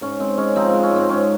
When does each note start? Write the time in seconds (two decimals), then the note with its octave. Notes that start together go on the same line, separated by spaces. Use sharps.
0.01 G#2 C#4
0.20 G#3 C4
0.37 G#3 C#4
0.56 F3 C4 D#4
0.69 G#3 C4
0.83 C#4
0.91 G#2 C4
1.09 G#2 C#4